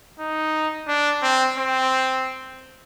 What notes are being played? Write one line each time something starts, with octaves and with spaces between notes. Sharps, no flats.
D#4
D4
C4
C4